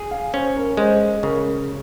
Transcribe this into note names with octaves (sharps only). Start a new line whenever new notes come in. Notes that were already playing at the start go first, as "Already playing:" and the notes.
Already playing: G#4
F5 G#5
C#4 C5
A#4
G#3 C5
C#3 A#4